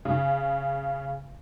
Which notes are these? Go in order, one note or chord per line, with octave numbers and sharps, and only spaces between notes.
C#3